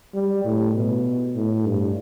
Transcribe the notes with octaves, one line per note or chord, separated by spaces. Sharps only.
G3
A2
B2
A2
G2